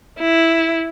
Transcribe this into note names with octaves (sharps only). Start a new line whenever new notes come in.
E4